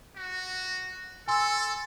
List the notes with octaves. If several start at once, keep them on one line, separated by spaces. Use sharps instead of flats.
F#4
A4 G#5 C6 E6